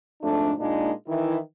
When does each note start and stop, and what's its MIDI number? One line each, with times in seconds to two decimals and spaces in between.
0.22 0.52 41
0.22 0.52 44
0.22 0.52 57
0.22 0.52 62
0.59 0.91 46
0.59 0.91 56
0.59 0.91 58
0.59 0.91 62
0.59 0.91 63
1.07 1.37 51
1.07 1.37 52
1.07 1.37 64